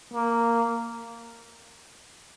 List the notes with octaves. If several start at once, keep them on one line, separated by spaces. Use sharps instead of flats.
A#3